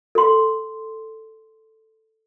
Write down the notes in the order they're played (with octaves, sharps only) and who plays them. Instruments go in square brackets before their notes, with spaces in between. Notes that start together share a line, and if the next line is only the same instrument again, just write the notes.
[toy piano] A4 C6